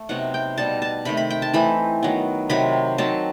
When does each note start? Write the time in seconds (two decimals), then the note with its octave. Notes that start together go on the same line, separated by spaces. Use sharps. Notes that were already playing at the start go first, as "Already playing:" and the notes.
Already playing: A3
0.09 C3 F#3 B3 D#4 F#5
0.34 G5
0.58 B2 G3 D#4 A5
0.82 A5
1.05 C3 D#3 A3 B5
1.17 B5
1.30 G5
1.42 A5
1.54 E3 A3 C4 D#4 B5
2.03 D#3 F#3 B3
2.49 C3 D#3 F#3 B5
2.98 D#3 F#3 C4 A5